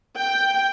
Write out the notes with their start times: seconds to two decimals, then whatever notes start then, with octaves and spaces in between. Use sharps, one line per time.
0.16 G5